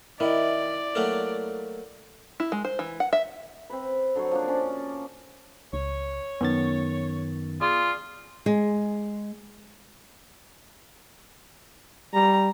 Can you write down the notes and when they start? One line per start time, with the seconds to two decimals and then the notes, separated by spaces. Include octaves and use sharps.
0.20 D#3 E4 D5
0.95 F#3 A3 A#3
2.40 E4
2.52 G#3
2.65 C5
2.79 E3
3.00 F#5
3.13 E5
3.70 C4 B4
4.15 D3 F#3 C5 C#5
4.31 F3 A#3 D4
4.48 C#4 D5
5.73 C#2 C#5
6.41 F#2 D#3 B3 A6
7.61 F4 G#4 D5
8.46 G#3
12.14 G3 A#5